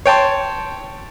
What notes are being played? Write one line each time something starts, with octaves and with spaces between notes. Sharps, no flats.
C#5 G5 A5 C6